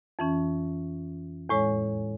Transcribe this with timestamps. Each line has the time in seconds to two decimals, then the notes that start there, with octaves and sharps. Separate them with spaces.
0.19 F2 E3 C#4
1.49 E2 A2 G#3 C#5